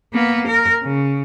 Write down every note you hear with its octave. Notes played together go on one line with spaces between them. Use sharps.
A#3 B3
A#4
C#3